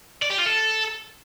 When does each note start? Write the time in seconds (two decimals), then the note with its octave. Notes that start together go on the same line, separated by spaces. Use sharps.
0.22 D5
0.30 G4
0.38 F4
0.46 A4